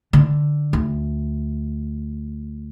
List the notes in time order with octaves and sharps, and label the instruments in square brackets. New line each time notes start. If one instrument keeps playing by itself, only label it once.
[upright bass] D3
D2